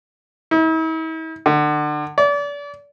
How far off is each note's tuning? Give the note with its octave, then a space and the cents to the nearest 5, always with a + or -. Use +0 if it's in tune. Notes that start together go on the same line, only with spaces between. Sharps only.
E4 -45
D3 +35
D5 -35